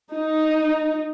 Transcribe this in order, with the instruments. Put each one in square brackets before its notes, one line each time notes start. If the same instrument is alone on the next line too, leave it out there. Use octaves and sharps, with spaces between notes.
[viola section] D#4